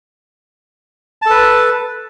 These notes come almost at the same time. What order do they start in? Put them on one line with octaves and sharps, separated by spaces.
A5 A4 B4